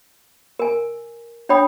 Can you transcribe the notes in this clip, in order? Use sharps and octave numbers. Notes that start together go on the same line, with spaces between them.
A#4 G#5
D4 C#5 G5 B5 D#6